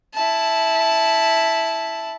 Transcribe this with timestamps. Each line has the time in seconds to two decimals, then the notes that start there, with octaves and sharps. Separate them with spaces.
0.14 E4 A5